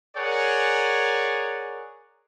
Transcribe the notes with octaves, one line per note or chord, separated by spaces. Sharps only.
G#4 A#4 C#5 D5 F#5 G#5